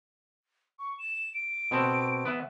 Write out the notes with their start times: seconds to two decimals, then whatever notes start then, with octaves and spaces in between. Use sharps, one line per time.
0.79 C#6
0.99 E7
1.34 D7
1.71 B2 C4 A4
2.25 B3 B4 E5